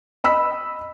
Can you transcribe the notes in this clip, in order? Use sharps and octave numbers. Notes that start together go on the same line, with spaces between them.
D#5 B5 E6 B6